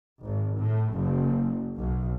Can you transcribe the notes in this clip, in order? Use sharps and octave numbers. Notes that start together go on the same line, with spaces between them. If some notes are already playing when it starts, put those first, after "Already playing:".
G#1
A2
F#1
B1